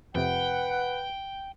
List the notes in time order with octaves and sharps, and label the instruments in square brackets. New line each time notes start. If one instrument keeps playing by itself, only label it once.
[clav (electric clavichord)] F2 C3 [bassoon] B4 [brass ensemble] F#5 [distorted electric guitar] G5